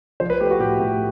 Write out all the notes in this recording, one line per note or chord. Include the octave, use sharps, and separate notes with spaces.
F3 C5
B4
A3 G4
F#4
A2 G4
A2